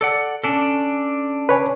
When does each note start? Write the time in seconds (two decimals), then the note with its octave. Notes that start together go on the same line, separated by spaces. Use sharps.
0.01 A4 D5 F#5
0.44 C#4 D4 A4
1.49 B4 C#5 G#5